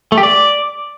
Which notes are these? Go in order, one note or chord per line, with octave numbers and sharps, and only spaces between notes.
A3
G4
D5